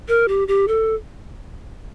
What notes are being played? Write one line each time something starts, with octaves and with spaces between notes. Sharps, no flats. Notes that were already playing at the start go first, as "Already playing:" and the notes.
A#4
G4
G4
A4